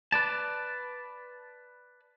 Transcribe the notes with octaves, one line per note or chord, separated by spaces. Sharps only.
B4 D5 A5